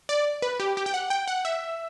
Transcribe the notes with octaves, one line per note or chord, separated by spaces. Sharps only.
D5
B4
G4
G4
G5
F#5
G5
F#5
E5